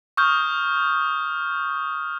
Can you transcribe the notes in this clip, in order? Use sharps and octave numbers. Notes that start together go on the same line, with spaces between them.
C#6 D#6 F6 G6